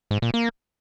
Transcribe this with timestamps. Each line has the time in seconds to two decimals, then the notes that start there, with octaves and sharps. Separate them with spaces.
0.11 G#2
0.22 A#2
0.34 A#3